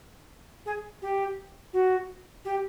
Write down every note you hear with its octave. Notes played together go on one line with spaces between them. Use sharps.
G#4
G4
F#4
G4